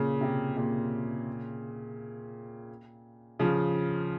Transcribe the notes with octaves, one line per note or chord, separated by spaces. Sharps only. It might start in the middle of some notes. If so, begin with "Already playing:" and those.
Already playing: A#2 C#3
C3
A#2 C#3
C#3 F3